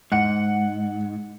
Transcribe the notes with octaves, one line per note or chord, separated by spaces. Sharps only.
G#2 F#5 C#7